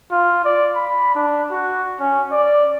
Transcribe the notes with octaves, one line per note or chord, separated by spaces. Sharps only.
F4
D5
B5
D4
F#4
C#4
D5